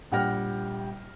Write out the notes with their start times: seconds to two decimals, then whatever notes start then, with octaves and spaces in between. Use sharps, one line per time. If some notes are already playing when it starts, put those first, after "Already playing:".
0.12 A#1 G3 F#5 G5 F6 A#6